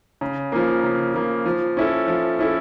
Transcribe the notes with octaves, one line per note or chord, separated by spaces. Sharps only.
C#3
F3 A#3
C#3
F3 A#3
F3
C#4 E4 A4
F3
C#4 E4 A4